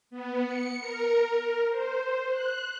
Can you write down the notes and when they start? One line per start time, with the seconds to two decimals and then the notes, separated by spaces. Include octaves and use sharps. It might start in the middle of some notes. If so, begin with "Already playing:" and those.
0.11 B3
0.45 C#7
0.80 A#4
1.71 C5
2.30 F#6